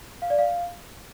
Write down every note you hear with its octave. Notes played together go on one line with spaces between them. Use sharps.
F5
D5
F5